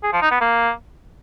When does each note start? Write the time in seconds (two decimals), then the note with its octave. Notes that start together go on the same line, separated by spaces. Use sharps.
0.03 G#4
0.13 F3
0.22 D#4
0.31 B3
0.41 A#3